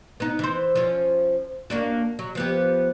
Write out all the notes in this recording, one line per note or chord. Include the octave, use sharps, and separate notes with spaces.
B3 D#4
E3 C5
F3 C#4
A#3 D4 F#4
F#3
F3 B3 G4